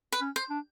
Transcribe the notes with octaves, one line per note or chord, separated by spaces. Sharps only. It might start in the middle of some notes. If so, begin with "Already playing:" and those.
B4
C#4
C5
D4